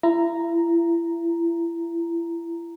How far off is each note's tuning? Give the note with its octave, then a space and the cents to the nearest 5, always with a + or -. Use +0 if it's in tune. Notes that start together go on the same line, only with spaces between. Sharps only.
E4 +35 A#5 +0